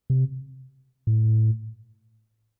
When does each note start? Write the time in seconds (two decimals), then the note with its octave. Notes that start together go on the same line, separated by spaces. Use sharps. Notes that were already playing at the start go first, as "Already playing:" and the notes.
0.10 C3
1.07 A2